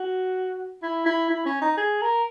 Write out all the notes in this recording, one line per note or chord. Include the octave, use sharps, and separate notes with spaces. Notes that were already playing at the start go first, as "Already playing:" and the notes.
Already playing: F#4
E4
E4
E4
C#4
D#4
G#4
A#4